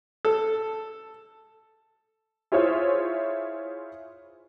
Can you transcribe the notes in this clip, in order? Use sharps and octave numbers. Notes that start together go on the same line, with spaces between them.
A4
E4 F4 G#4 C5 C#5 E5